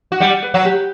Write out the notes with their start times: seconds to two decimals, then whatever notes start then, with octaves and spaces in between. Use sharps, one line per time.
0.12 F#4
0.20 G3 G4 F#5
0.43 B4
0.54 F#3 F#4
0.65 G4